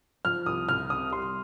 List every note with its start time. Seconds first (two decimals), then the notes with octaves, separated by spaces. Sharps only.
0.25 F3 F6
0.46 C2 D#6
0.69 C2 F6
0.90 C3 D#6
1.11 G3 C6